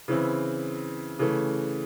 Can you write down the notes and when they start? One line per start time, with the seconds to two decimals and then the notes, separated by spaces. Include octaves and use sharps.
0.08 C#3 E3 C4 E4
1.19 C#3 E3 A3